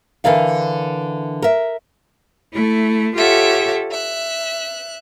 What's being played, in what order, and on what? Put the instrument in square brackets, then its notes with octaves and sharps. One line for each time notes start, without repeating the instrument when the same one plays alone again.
[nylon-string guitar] D3 E3 A#4 D5 F5
A#4 E5
[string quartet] A3 E4
F4 G4 A4 C#5 E5 F#5
E5 F#6